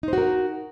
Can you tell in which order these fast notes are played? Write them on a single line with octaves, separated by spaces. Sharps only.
D#4 C5 F#4 A#4